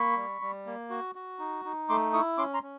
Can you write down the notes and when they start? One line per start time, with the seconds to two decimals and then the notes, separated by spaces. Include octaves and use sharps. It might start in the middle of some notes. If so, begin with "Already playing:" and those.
Already playing: A#3 B5 C#6
0.17 G3
0.42 G3
0.66 A#3
0.90 F#4
1.15 F#4
1.39 D#4
1.65 D#4
1.89 A3 C6 D6
2.13 E4 C#6 D#6
2.38 C#4 C6 D6
2.54 A#5 C6
2.63 C#4